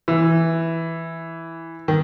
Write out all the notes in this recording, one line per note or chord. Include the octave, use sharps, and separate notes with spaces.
E3
D#3